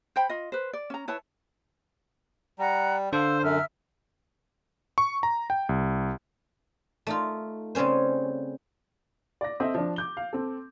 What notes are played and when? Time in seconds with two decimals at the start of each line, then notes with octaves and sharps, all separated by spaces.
0.16 C5 G5 B5
0.30 F4 D#5
0.52 B4 C5
0.73 D5
0.90 C#4 A#5
1.08 E4 B4 C#5 A5
2.59 G3 F#5 A#5
3.13 D3 D4 A4 C5 F5 E6
3.42 F#2 E5 E6 F6
4.98 C#6
5.23 A#5
5.50 G5
5.69 C2
7.07 A3 D#4 F4
7.75 C#3 G3 C4 C#4 C5
9.41 D5 A#6
9.60 C4 A4 C5 D#5 E5
9.75 F3 D4
9.96 D6 G6 G7
10.17 F5
10.33 C4 A4